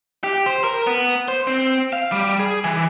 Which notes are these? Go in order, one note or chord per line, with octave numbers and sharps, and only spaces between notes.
G4
C5
A#4
B3
C5
C4
F5
G3
G#4
E3